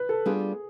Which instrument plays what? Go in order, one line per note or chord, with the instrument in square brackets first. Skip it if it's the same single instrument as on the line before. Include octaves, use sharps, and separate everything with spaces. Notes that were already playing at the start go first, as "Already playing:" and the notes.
Already playing: [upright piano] B4
A4
[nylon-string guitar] G3 B3 D4 F4 [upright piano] G#4